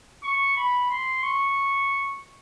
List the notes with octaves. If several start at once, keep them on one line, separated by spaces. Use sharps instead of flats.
C#6
B5
C6
C#6